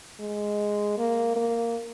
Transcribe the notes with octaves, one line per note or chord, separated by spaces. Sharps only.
G#3
A#3
A#3